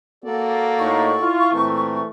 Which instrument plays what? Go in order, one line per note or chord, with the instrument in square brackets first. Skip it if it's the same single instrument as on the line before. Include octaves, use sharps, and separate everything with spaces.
[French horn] A#3 [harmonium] F#4 A4 D5
[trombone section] A2 D#4 [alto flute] C#6
[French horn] E4 [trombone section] F4
[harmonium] A#2 C4 A#4 [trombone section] E3 A3